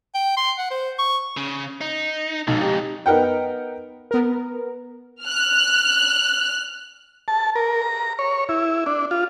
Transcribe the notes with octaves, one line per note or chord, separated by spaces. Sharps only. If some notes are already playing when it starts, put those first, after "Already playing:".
G5
C6
F#5
C5
C#6
C#3
D#4
B1 F2 G#2
D#4 G4
B3 D#4 A#4 F#5 G5
B3 A#4
F6 F#6
A5
A#4
A#5
C#5
E4
D4
F4